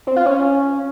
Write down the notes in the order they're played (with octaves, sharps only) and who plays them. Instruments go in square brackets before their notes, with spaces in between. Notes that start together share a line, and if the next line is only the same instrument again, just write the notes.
[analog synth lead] C4
F4
C#4